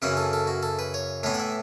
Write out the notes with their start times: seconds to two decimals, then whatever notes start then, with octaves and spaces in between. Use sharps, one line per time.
0.02 F#2 C#3 E3 C#4 E4 F#5
0.17 A4
0.33 A4
0.47 F#4
0.63 A4
0.79 B4
0.94 C#5
1.23 A2 E3 B3 E4 C#5
1.34 F#5
1.40 E5